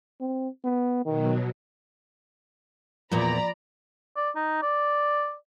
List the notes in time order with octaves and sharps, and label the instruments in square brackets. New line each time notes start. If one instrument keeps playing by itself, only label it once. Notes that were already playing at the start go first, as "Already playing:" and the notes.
[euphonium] C4
B3
[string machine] B2 F#3 [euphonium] D#3
[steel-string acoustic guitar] E2 A#2 [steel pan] F3 [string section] D5 A#5 B5
[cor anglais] D5
D#4
D5